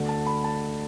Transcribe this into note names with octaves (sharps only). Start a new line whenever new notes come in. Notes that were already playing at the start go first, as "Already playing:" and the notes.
Already playing: D2 D3 A3
A5
B5
A5